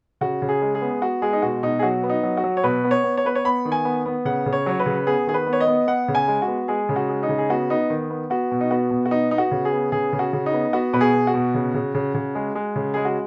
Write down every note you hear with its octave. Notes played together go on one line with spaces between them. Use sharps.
C#3 F#4
C#3
G#4
G#3
G#4
B3
B3 F#4
G#3 G#4
D#4
B2 F#4
B2 D#4
G#4
F#3 F#4
B3
D#4
F#3
F#4
F#3
C#5
B2 B4
B3
C#5
B3
C#5
B3 B4
C#5
B3 B5
D#3
G#5
B3
B3
C#3 F#5
C#3
C#5
F#3 C#5
B4
C#3
B3 G#4
D#3 G#4
B4
B3
C#5
D#5
B3
B3 F#5
C#3
G#5
G#3
F#4
B3
G#3 G#4
C#3
F#4
G#3
D#4
C#3
G#4
B3 F#4
B3 D#4
D#3
B3
B3 F#4
B2
D#4
B3 F#4
B2
F#4
B3 D#4
B3 D#4
F#4
C#3
G#4
B3
C#3 G#4
C#3
F#4
C#3
D#4
B3
B3 F#4
B2 B4
G#4
B2
F#4
B2
C#3
C#3
C#3
C#3
G#3
G#3
C#3
G#3 G#4
F#4